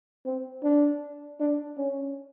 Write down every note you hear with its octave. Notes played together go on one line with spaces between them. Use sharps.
C4
D4
D4
C#4